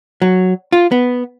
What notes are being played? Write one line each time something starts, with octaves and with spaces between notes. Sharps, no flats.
F#3
F4
B3